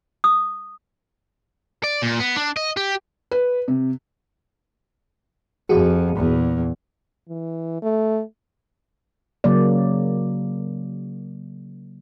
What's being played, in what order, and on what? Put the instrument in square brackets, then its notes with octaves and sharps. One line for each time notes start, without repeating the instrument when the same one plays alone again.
[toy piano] D#6
[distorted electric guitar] D5
A#2
B3
D4
D#5
G4
[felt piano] B4
C3
[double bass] F2 [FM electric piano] F#4 G#4
[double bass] E2 A#2
[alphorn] E3
A3
[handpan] C#3 F#3 A#3 D5